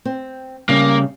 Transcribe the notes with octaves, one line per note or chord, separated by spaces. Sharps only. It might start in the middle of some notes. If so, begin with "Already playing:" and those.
C4
C#3 G3 A#3